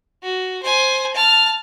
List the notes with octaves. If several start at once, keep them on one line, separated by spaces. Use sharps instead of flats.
F#4
C5 G#5
A5 F6